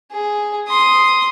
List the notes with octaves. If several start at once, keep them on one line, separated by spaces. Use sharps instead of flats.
G#4
C6 D#6